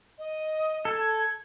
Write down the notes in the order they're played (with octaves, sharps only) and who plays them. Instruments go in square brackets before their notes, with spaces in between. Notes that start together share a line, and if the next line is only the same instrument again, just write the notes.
[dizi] D#5
[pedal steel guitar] A4 [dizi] G#6